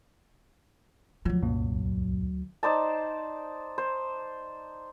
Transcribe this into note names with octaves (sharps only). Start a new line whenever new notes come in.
D2 F3 F#3
C2 F#2 A#2
D#4 C5 D5 A5
C5